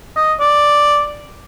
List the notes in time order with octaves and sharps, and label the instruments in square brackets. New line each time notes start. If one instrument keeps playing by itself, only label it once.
[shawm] D#5
D5